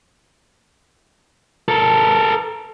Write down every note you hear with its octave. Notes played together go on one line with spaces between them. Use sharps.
A4 A#4